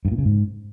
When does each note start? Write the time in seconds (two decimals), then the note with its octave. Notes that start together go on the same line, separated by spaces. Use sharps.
0.05 G2
0.12 A#2
0.18 C#3
0.25 G#2